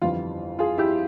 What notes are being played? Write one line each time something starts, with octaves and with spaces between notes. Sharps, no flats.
G1 F2 E3 G3 F4
F4 G#4
E4 G4